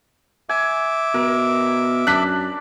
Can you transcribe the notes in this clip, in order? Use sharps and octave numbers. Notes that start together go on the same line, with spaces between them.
E5 G#5 D6
B2 A#4
F#2 D4 F#6 B6